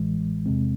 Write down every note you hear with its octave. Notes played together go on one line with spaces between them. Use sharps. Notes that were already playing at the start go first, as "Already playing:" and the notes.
Already playing: A1 A2 E3 G#3
E2 C3 G#3 C4